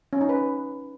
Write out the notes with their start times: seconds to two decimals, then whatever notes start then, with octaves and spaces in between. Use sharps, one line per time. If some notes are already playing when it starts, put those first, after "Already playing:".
0.13 C#4
0.21 D#4
0.29 B4